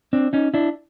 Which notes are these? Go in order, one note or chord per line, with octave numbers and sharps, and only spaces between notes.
C4 D4
C#4 D#4
D4 E4